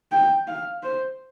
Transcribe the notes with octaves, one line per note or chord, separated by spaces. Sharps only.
G5
F5
C5